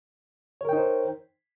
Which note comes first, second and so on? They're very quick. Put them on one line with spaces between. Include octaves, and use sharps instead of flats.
C#5 A#4 G5 D#4 C5